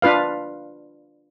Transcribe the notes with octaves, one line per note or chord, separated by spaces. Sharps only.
D4 F4 B4 F5